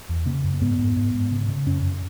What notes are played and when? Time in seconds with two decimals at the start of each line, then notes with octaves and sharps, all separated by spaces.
0.09 E2
0.26 C#3 A#3
0.44 F#2
0.61 G#2 B3
0.78 G#2
0.96 G#2
1.14 G#2
1.31 C#3
1.48 C#3
1.66 F#2 C#4
1.83 F#2